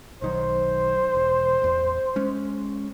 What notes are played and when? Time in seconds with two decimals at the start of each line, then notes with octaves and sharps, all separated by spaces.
0.22 B1 D#3 F#3 C5
1.15 E1
1.62 A1 E2
2.16 G#3 C#4